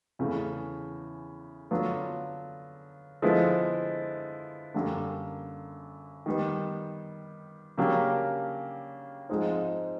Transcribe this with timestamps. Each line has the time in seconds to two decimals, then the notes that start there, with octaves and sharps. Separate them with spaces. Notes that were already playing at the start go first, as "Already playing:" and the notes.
0.19 E2 C#3 E3 A3
1.71 D3 F#3 B3 D4 F4
3.22 D3 F3 G#3 B3 E4
4.74 F#2 D3 G3 A#3 D4
6.26 D#3 G3 B3
7.78 C#3 F#3 A#3 D4 G4
9.29 G#2 F3 G#3 C4 D#4